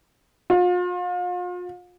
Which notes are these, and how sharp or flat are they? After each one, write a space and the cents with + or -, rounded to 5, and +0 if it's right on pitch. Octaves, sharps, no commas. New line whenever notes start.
F4 +40